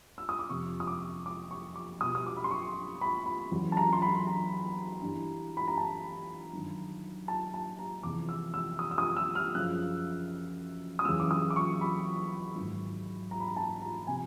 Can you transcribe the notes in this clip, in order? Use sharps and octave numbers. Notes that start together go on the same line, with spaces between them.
E6
D#6
D6
F2 C3 F3 C#6
D#6
D6
D6
C#6
D6
B2 G3 D#6
D#6
D6
B5
C6
C#6
B5
B5
E2 C#3 F#3
A5
A#5
C6
B5
A#5
G2 E3 G3
B5
A#5
A5
G2 D#3 F#3
A5
A5
A#5
E2 C3 F3 D6
E6
E6
D#6
E6
D#6
E6
F6
F#2 C#3 F3 F#6
D#6
E2 C#3 F#3 E6
D6
D#6
D6
C#6
B5
G#2 D#3 F#3
A#5
B5
A#5
A5
A#5
C3 F3 G#5